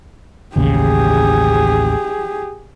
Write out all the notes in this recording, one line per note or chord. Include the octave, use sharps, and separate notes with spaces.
A1 D#2 C#3 G4 G#4